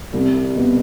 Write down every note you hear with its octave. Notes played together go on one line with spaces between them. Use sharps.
C2
B2 B3